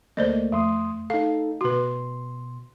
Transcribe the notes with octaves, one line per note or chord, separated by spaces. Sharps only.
D2 A3 A#3 C5 D5 D#5
F2 A3 C6 D#6
D#4 A4 F5
B2 F#4 B4 C6